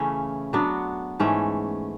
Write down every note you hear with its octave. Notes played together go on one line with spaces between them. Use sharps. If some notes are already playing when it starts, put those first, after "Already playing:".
Already playing: C#3 E3 A3 C#4
F#3 B3 D4 F#4
G#2 E3 A3 C#4